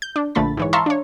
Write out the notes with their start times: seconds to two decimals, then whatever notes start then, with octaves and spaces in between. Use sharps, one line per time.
0.02 G6
0.16 D4
0.35 A#1 D3 F3 A3 B5 A6
0.57 G#2 E3 C#5
0.73 E5 F5 A5 A#5 C6 C#6
0.86 D4 C#5